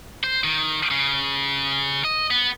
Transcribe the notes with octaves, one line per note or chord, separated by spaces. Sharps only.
C5
D#3
C#3
D#5
B3